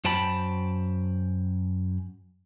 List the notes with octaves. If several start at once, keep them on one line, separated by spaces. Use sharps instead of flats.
F#2 C5 G5 A5 B5